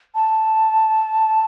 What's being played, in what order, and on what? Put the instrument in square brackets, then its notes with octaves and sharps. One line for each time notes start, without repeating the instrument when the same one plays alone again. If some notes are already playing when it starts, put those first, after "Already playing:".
[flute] A5